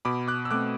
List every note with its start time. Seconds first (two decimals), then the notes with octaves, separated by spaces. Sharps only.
0.05 B2 B5 D6
0.28 D6 F#6
0.45 E6
0.51 A3 C4 D6 F#6